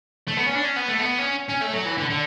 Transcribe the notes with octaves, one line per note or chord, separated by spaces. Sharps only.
A3
B3
C#4
D4
C#4
B3
A3
B3
C#4
C#4
A3
F#3
E3
D3
D3